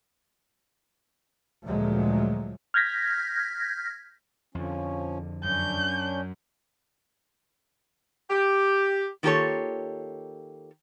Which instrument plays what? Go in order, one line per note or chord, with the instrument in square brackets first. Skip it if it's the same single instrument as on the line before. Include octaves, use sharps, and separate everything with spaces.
[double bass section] D2 A#2 F3 F#3 G#3 A3
[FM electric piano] F6 G6 G#6 A#6 B6
[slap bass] F2 D3 [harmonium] F3 C#4
[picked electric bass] F#2 [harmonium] C#4 D4 [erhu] G6
[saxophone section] G4
[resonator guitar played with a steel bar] D#3 A#3 F4 G4 A4 C#5